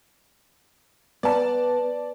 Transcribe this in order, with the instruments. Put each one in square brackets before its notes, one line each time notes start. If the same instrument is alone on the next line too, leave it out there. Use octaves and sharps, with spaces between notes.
[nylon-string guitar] B3 [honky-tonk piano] D5 A5